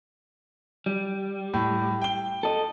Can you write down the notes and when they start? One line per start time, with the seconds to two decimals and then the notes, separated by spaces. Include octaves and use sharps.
0.86 G3
1.54 A2
2.01 G5 G7
2.43 A4 D#5